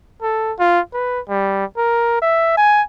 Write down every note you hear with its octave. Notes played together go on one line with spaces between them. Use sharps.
A4
F4
B4
G3
A#4
E5
G#5